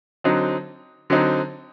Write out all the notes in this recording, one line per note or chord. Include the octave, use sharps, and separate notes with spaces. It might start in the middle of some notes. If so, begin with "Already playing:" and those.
D3 F#3 C4 D#4
D3 F#3 C4 D#4